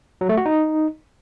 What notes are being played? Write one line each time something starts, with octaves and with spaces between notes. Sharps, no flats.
F#3
A3
F#4
D#4